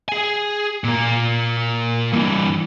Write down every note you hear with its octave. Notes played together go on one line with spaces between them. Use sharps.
G#4 G#5
A#2 A#3
G2 E3